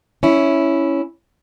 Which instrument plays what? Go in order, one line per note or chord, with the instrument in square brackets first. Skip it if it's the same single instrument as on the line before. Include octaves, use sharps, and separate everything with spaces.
[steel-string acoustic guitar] C#4 E4